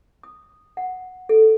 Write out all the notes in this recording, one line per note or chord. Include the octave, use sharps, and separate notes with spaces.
D#6
F#5
A4